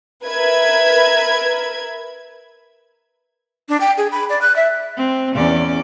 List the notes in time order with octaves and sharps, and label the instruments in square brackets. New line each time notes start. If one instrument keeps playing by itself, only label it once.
[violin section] A#4 B4 E5 G#6
[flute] D4
G5
G#4
B5
D5
F#6
E5
[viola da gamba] C4
E2 C#4 D5